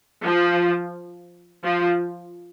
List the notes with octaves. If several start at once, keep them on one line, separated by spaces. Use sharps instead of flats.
F3
F3